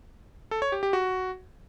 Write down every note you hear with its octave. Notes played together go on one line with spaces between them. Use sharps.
A4
C#5
G4
G4
F#4